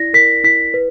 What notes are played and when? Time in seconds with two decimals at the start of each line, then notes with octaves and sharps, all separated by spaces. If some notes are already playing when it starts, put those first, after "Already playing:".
Already playing: E4 D5 A#6
0.13 A#4 B6
0.44 E4 B6
0.74 B4